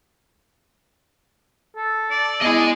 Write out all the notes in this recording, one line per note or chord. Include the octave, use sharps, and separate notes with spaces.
A4
D5
B3 E4 G#4 D#5 G#5